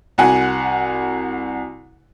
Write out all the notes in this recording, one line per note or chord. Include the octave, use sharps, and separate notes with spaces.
C2 F#4 F#5 G#5